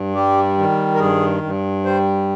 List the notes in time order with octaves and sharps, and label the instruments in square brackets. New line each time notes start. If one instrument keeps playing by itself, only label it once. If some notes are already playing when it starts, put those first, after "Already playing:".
Already playing: [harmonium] G2
G3 G4
D#3
A#4
G2 G#4
G2
G3 C5